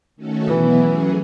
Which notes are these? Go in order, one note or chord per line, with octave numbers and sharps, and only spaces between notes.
D#3 A3 C#4 F#4 A4
B2 E3 F#3 B3 E4
F#3 A3 C#4 G#4